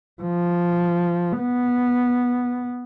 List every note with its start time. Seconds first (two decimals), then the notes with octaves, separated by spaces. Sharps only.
0.22 F3
1.39 B3